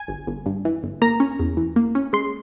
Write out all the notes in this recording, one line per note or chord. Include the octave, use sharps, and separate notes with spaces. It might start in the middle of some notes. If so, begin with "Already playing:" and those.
Already playing: G#5
G1
G1
G2
E3
G1
A#3 A#5
C#4
E2
E3
A#3
C#4
G#3 C6